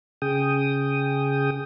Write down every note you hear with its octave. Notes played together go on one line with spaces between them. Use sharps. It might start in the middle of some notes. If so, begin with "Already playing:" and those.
C#3 G#4 G5 D#6